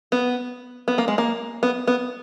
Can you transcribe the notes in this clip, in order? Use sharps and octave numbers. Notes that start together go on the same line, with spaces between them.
B3
B3
A#3
G#3
A#3
B3
B3